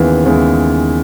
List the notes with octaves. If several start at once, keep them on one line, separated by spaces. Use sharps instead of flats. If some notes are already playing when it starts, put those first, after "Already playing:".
Already playing: D#2 C#3 E3 G#3 B3
D#2 C#3 E3 G#3 B3